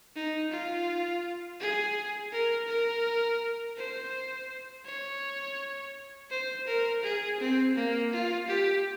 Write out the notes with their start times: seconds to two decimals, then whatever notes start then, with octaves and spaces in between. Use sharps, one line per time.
0.15 D#4
0.51 F4
1.60 G#4
2.32 A#4
2.68 A#4
3.77 C5
4.85 C#5
6.30 C5
6.67 A#4
7.03 G#4
7.40 C4
7.76 A#3
8.12 F4
8.48 G4